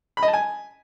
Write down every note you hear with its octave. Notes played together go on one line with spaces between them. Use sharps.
B5
D#5
A5
G#5